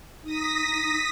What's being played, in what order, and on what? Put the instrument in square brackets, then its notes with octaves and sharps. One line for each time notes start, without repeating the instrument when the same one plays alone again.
[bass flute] D#4 [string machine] D#6 A#6 B6